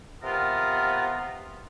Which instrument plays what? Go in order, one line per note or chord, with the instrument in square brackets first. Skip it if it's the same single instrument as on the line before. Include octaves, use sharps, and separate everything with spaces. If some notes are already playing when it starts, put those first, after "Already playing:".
[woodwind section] C3 B3 F4 A#4